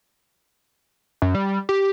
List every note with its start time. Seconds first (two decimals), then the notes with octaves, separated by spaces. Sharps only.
1.22 F#2
1.35 G3
1.69 G4